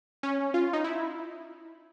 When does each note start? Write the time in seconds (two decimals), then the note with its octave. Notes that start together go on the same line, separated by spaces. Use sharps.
0.23 C#4
0.54 F4
0.73 D#4
0.84 E4